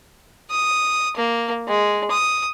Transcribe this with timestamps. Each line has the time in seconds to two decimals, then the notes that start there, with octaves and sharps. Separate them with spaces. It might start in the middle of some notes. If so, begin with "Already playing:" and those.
0.51 D#6
1.17 A#3
1.68 G#3
2.11 D#6